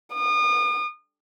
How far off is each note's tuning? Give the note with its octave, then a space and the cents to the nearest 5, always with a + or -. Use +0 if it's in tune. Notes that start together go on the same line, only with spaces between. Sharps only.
D#6 -40